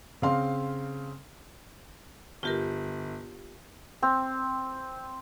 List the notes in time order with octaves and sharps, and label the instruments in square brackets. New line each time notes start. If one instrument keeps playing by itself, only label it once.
[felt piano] C#3 C4 F5 C6
[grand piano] G1 [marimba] F4 G4 A#4
[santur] C4